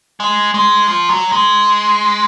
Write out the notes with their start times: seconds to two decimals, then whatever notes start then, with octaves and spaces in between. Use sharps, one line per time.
0.20 G#3
0.54 G#3
0.87 F3
1.09 F#3
1.32 G#3